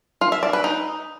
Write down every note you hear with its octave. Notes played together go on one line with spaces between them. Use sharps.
F4
E5
D5
B4
D#4